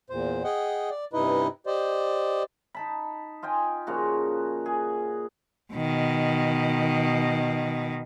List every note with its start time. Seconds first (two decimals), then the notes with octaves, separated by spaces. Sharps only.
0.10 E2 A#2 C5
0.44 G#4 D#5 F#5 G5
0.90 D5
1.13 G2 C3 D#4 E4 B4 D#5
1.66 G4 C5 D5 D#5
2.75 D#4 A5 B5
3.43 F4 D#5 G5 G#5
3.87 A#2 C#3 F3 F#4
4.66 G#4
5.73 B2 D#3